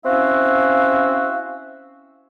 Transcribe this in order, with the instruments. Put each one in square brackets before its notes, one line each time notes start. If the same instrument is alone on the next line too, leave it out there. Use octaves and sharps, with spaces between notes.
[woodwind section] C4 C#4 E4 F#4 E5 F5